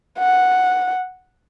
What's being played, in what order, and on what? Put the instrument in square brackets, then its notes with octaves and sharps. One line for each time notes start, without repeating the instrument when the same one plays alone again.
[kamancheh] F#5